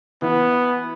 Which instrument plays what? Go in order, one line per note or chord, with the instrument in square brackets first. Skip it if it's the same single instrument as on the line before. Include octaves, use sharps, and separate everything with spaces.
[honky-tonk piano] E3 [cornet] B3